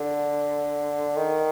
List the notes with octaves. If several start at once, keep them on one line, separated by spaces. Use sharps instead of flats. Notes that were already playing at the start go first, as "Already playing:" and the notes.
Already playing: D3
D#3